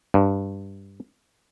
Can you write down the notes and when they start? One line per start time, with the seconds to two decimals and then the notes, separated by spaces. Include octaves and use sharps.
0.14 G2